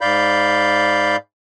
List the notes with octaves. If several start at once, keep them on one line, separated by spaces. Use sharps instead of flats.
G#2 D5 F5 B5 G6